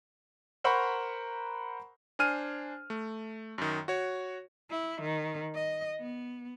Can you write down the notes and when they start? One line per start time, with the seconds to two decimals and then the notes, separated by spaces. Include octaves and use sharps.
0.64 A#4 C5 F#5 A#5 B5 C#6
2.19 D4 C5 G#5 F6 D#7
2.90 A3
3.58 F#2 D#3
3.88 F#4 C#5
4.70 E4
5.01 D#3
5.54 D#5
6.00 B3